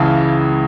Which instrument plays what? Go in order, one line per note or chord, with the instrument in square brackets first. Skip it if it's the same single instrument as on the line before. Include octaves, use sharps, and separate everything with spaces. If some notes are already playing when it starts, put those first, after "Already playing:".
Already playing: [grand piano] C#2 C#3 E3 F5 A5